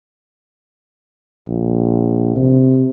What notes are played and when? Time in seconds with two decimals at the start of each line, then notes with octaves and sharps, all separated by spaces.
1.48 A#1
2.36 C3